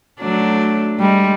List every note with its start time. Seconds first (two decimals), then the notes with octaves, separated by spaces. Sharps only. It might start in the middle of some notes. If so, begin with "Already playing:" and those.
0.20 F#3 A3 D4
1.00 G3 G#3